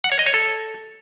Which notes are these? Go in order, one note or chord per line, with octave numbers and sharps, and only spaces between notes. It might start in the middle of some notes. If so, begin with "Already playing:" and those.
F#5
C#5
D#5
C#5
A4